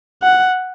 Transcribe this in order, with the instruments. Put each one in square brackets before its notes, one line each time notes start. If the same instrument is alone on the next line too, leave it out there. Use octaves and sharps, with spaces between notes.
[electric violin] F#5